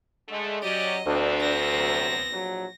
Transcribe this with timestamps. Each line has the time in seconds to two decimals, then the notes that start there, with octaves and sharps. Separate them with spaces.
0.29 D3 G#3 A3
0.63 F#3 C#4 G4 D5 D#5
1.06 D2 F3 B3 C4 D4
1.41 A#6
1.74 C3 F#3
2.31 A#1 F#3